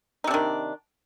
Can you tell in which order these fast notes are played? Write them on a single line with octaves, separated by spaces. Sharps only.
D#4 C3 D4 D#3